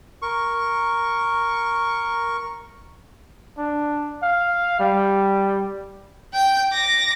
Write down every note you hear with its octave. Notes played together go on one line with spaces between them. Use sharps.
A#4 C#6
D4
F5
G3
G5 G6
D6 A#6